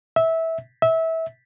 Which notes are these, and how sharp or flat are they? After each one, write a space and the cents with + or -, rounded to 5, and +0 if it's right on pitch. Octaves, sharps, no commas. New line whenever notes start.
E5 -15
E5 -20